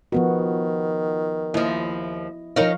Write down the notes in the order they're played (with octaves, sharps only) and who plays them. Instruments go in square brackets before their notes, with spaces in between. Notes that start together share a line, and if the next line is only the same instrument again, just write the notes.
[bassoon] D#3 [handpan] F3 B3 F#4
[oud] D#2 F3 [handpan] E4 D#5
[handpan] F3 F5 [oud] C#4 D#4 A#4